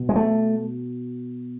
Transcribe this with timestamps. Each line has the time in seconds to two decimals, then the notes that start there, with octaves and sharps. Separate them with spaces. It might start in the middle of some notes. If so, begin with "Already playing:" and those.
Already playing: B2
0.09 G#3
0.16 A3